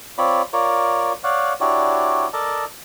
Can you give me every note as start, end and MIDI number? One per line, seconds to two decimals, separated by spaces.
0.18 0.42 60
0.18 0.42 65
0.18 0.42 73
0.18 0.42 74
0.18 0.42 83
0.53 1.12 65
0.53 1.12 70
0.53 1.12 73
0.53 1.12 74
1.24 1.53 73
1.24 1.53 74
1.24 1.53 77
1.24 1.53 78
1.60 2.28 62
1.60 2.28 64
1.60 2.28 66
1.60 2.28 67
1.60 2.28 73
1.60 2.28 74
2.33 2.65 69
2.33 2.65 70
2.33 2.65 74
2.33 2.65 75
2.33 2.65 81